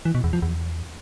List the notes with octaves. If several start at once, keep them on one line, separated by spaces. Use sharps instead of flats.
E3
B2
E2
F3
E2